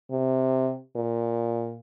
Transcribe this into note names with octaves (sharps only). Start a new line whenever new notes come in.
C3
A#2